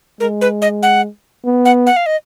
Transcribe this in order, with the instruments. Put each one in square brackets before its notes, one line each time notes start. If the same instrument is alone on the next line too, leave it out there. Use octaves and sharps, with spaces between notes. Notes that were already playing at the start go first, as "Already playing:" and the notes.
[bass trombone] G#3 [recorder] A#4
[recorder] B4
D#5
F#5
[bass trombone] B3
[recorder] F#5
F#5
F5
D#5